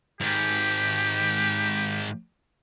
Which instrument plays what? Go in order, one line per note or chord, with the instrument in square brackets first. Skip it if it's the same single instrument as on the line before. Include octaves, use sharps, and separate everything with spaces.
[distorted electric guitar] G#2 D#3 [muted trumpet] G4